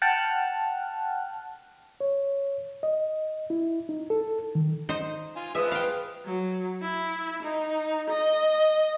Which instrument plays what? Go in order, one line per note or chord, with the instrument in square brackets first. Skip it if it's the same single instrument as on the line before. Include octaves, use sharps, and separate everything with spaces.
[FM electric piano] F#5 G5 A5 F6 F#6
[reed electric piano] C#5
D#5
E4
D#4
A4
D#3
[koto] D#4 C5
[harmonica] F4 G#5
[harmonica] F3 G#3 D#6 [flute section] B4 [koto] E5
[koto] F5 G5
[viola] F#3
E4
D#4
D#5